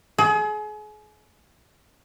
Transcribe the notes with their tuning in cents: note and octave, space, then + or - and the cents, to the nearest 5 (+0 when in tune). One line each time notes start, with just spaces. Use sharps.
G#4 +35